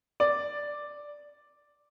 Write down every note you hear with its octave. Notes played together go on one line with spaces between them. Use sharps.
D5